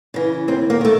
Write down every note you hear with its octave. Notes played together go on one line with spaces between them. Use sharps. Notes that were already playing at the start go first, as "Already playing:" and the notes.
C#3 E3
D#2 C4
A#3
D#3 A3